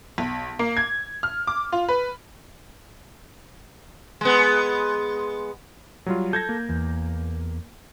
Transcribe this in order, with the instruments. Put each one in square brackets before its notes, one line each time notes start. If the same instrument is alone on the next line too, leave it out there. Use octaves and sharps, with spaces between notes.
[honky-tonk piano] B1
A#3
G#6
F6
D6
F4
B4
[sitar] G#3 B3
[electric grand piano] F#3 G3 F4
[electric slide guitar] A4 [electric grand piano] G6 G#6 A#6
[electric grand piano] A#3
[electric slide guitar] E2